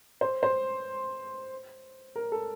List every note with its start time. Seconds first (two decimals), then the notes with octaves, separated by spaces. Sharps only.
0.21 C5
0.43 C5
2.16 A#4
2.32 A4